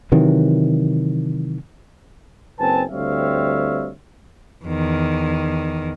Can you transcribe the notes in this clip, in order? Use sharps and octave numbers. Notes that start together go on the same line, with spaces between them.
C3 D#3 E3 F#3
F#1 C4 B4 G#5 A5
D2 G3 C4 C#5 E5 F5
E2 D#3